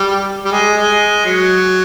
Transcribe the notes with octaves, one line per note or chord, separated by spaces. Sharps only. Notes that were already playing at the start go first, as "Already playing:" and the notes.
Already playing: G3
G3
G#3
G#3
F#3